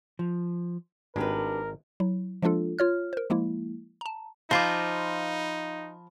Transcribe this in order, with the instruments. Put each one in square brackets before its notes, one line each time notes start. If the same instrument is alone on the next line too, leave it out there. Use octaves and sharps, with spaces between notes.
[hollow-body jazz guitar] F3
[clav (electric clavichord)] G#1 G#3 [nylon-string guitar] D4 G4 B4 [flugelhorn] A#4
[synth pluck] F#3 E4
F3 G#3 A#3 D4 F4 A4
F4 C#5 F6
A#4 C5
F3 G#3 A#3 E4
A5 A#5
[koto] F3 F4 [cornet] D#4 [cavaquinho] C5 D6 [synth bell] F5 B5